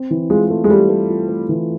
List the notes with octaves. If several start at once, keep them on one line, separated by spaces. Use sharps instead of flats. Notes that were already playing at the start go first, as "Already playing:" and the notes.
Already playing: C4
E3
G#3 F4
A3
G#3
G3 A3
A3
F4
A3
E3